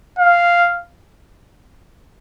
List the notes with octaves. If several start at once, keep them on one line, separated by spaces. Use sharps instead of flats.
F5